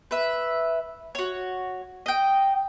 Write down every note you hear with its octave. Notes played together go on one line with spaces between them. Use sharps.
B4 E5
F#4 C#5
D#5 G5